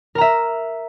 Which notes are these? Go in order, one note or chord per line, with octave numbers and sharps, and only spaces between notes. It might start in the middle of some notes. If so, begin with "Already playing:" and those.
A#4 E5 A#5